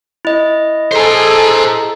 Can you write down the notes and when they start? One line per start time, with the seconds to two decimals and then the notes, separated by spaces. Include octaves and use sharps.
0.25 E4 D#5
0.92 G#4 A4 C5 A#5